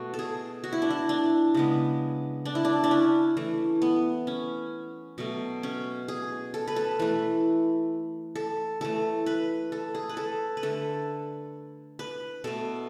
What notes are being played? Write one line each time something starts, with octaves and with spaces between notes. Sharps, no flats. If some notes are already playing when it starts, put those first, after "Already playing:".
Already playing: B2 A3 F#4
A4
G#4
F#4
E4
D4
E4
D4
C#3 G#3 B3
D4
E4
D4
D4
C#4
E3 A3
B3
C#4
B2 F#3 A3
C#4
G#4
A4
B4
A4
E3 A3 B4
A4
E3 A3 A4
B4
A4
G#4
B4
A4
B4
D3 A3 A4
B4
B2 A3 A4